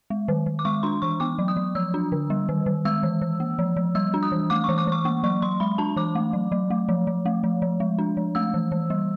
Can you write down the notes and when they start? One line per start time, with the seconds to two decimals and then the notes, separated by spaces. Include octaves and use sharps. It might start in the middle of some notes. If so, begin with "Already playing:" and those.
0.10 G#3
0.28 D#3
0.46 D#3
0.59 D6
0.65 G#3 C#6
0.83 D4 C6
1.02 E3 C#6
1.20 B3 D6
1.39 F#3
1.48 D#6
1.57 F#3
1.75 F3 E6
1.94 D4
2.12 D3
2.30 G3
2.49 D#3
2.66 D#3
2.85 G#3 E6
3.03 E3
3.21 E3
3.40 A#3
3.59 F3
3.77 F3
3.95 G3 E6
4.14 D4
4.23 D#6
4.32 E3
4.50 A3 D6
4.64 E3 C#6
4.78 D6
4.87 E3 C#6
5.05 A#3 C#6
5.24 F#3 C#6
5.42 F#3 C6
5.60 G#3 B5
5.78 D4 A5
5.96 E3 D6
6.15 A3
6.33 F#3
6.52 F#3
6.70 A3
6.89 F3
7.07 F3
7.26 A3
7.44 F3
7.62 F3
7.80 G#3
7.98 D4
8.17 F3
8.35 A3 E6
8.54 E3
8.72 E3
8.90 G3